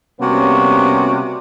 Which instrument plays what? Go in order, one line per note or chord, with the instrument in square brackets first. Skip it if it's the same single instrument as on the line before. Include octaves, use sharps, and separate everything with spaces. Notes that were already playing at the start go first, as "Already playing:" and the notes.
[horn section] C3 A#3 F#4 [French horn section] G3 B3 C#4